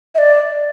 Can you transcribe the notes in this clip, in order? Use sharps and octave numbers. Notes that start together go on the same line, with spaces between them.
E5
D5